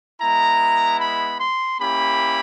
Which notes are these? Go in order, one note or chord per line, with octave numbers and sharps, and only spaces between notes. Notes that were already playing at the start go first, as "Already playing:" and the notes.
G#3 B3 E4 A#5
B5
C6
A#3 C#4 E4 G4 B5